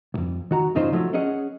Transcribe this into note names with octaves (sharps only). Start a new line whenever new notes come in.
B1 F2
D#3 F#4 A#5
E2 G2 C#3 D#4 F4 C5
F3 F#3 A3
C#4 G#4 D#5 F#5